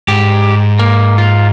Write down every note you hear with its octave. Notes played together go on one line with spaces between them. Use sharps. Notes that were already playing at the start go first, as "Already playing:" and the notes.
G#2 G4
A#3
F4